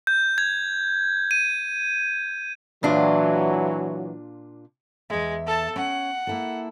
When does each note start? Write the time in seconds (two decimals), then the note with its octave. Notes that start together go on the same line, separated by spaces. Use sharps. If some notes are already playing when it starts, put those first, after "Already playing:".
0.07 G6
0.38 G#6
1.31 D#7
2.83 A#2 E3 F#3 D4 F4
5.10 E2 G#3 E5
5.46 A4 A5
5.76 C#4 F#5
6.27 A#3 E4 A4